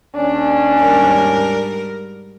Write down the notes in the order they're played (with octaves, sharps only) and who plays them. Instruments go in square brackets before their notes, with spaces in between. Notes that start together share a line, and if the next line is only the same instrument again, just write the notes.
[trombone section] D#2 C#4 [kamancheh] D4
[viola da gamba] G#2 G3 A#4